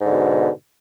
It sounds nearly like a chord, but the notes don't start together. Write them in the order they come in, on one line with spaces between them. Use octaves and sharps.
G#2 D3 B2